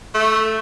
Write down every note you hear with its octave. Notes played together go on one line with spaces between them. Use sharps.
A3